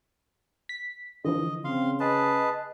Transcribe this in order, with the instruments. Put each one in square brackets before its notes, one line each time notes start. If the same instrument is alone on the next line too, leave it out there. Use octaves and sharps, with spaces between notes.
[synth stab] B6
[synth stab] D3 E3 F3 [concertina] D#5
[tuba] C#3 [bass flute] C4 [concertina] F5 C6
[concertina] G#4 B4 A5 [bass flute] D#5